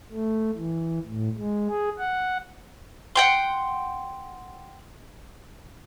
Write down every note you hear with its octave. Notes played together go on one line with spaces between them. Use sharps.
A3
E3
A2
G#3
G#4
F#5
F#5 G5 C6